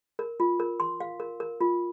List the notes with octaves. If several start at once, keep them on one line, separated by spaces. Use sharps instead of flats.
A#4
F4
A#4
C6
F5
A#4
A#4
F4